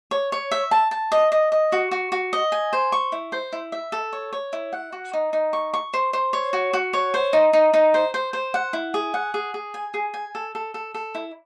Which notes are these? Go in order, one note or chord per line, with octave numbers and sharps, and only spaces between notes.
C#5
C#5
E5
A5
A5
D#5
D#5
D#5
F#4
F#4
F#4
D#5
G#5
C5
C#6
E4
C5
E4
E5
A4
C#5
C#5
E4
F#5
F#4
D#4
D#4
C#6
C#6
C5
C5
C#5
F#4
F#4
C#5
C5
D#4
D#4
D#4
C5
C5
C5
F#5
E4
G#4
F#5
G#4
G#4
G#5
G#4
G#5
A4
A4
A4
A4
E4